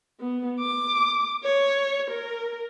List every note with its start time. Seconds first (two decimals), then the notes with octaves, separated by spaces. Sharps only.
0.20 B3
0.60 D6
1.44 C#5
2.10 A#4